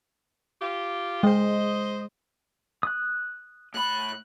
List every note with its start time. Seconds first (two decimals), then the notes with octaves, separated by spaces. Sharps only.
0.60 F4 G4
1.23 G#3 C5 D#5
2.83 D#6 F#6
3.74 A2 B5 F#6